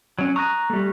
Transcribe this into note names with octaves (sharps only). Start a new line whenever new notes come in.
F#3 C#4 G#6
A#5 C#6 D#6 F#6 A#6
G3 A3